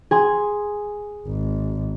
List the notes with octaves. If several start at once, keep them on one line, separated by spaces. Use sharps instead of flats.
G#4 G#5 C6
G#1